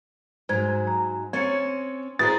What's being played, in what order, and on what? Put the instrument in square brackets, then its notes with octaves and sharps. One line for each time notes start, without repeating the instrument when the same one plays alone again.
[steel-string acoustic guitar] G#2 F#3 [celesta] C5 G#6
[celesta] A#5
[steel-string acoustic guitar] C4 C#4 [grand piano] C#5 [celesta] G#6 A6 C#7
[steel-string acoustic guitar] E4 G#4 C5 [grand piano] B4 A#5 [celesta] D#6 [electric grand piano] A6